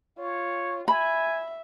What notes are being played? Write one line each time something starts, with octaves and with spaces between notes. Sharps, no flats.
F4 C#5
E5 G#5 B5